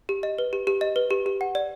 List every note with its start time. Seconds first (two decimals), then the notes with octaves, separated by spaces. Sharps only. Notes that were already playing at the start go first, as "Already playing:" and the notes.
0.09 G4
0.23 D#5
0.38 B4
0.53 G4
0.67 G4
0.81 D#5
0.96 B4
1.10 G4
1.26 G4
1.41 F#5
1.55 D5